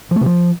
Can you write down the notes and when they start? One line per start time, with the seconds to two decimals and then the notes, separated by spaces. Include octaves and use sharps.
0.11 F3
0.16 A3
0.21 C3
0.26 F3